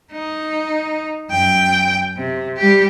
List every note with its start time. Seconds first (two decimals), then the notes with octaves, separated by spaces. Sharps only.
0.12 D#4
1.31 F#2 G5
2.17 C3
2.57 G3 G4